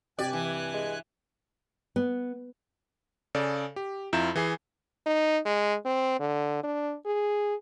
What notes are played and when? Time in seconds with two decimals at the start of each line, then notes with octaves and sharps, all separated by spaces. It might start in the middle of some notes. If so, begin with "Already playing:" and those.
0.19 G2 C3 G4 D5 G#5 F#6
0.33 E3
0.74 G#3
1.96 B3
3.35 C#3 G#4 A4 D5
3.76 G4
4.13 F2 E4 F4 A#5 G6 E7
4.36 E3 G#4 G#5 C7
5.06 D#4
5.45 G#3
5.85 C4
6.20 D3
6.63 D4
7.05 G#4